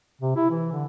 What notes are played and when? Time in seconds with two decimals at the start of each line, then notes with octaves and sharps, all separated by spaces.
0.21 C3
0.36 E4
0.50 E3
0.71 D3